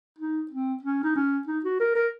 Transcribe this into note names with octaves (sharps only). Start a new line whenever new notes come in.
D#4
C4
C#4
D#4
C#4
D#4
F#4
A#4
A#4